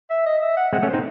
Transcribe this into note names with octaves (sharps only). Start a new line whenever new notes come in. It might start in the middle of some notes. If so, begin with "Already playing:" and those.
E5
D#5
E5
F#5
G#3 C4 F#5
A3 C#4
C5
C4 D#4